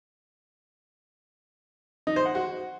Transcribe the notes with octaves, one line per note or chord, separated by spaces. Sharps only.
D#4
C5
F#5
F#4